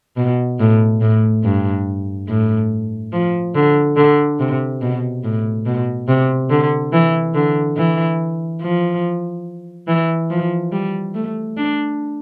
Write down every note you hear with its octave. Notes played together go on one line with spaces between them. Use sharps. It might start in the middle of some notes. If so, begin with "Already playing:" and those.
B2
A2
A2
G2
A2
F3
D3
D3
C3
B2
A2
B2
C3
D3
E3
D3
E3
F3
E3
F3
G3
A3
D4